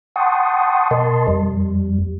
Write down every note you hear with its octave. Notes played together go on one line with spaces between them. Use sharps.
F#5 G5 A5 C6 C#6 D#6
B2 A#4 D#5 A5 C6
F2 G3